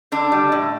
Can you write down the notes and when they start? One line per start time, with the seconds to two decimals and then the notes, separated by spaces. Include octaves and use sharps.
0.12 D3 D4
0.32 G3
0.52 A2